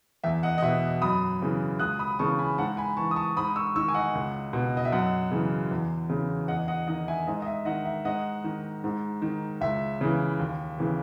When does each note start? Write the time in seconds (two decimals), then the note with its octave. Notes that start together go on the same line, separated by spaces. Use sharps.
0.24 E2 E5
0.43 D#5 F#5
0.58 D#5
0.62 B2 E5
1.02 F#2 B5 D#6
1.41 C#3 E3
1.79 C#2 D#6 F#6
1.99 B5 D#6
2.19 C#3 E3 A5 C#6
2.39 G#5 B5
2.58 G#2 F#5 A5
2.77 G#5 B5
2.97 E3 A5 C#6
3.11 D#6
3.16 A5 C#6
3.36 G#2 B5 D#6
3.56 C#6 E6
3.76 D#3 C#6 E6
3.88 G#5
3.94 D#5 F#5
4.15 C#2
4.53 B2
4.77 D#5
4.85 E5
4.92 F#2 D#5 F#5
5.31 C#3 E3
5.71 E2
6.10 C#3 E3
6.48 E2 D#5 F#5
6.68 D#5 F#5
6.87 D#3 D#5 F#5
7.08 E5 G#5
7.27 G#2 D#5
7.42 D#5
7.46 E5
7.65 D#3 D#5 F#5
7.85 E5
8.05 G#2 D#5 F#5
8.44 D#3
8.84 G#2
9.22 D#3
9.61 C#2 E5
10.01 C#3 E3
10.39 D#2
10.78 C#3 E3